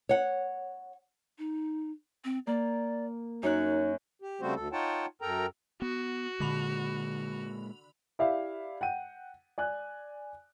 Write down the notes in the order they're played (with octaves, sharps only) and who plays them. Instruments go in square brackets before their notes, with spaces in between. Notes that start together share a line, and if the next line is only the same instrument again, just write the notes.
[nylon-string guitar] C#5 F#5
[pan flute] D#4
C4
[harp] A#3 [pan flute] D5
[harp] F#2 C#5 F#6 [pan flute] D#4
[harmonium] G4
C#3 G3 A3 C4 F#4 C5
D2 A4
D#4 F4 C#5 F#5 G5 A5
F#2 A4 A#4 G5 A#5
[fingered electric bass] B3 [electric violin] F#4
[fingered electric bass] A#2 G#3 [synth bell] D3 B5 F7
[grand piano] E4 G4 D5 E5 F5
F#5 G5 D#7
D5 G#5 F#6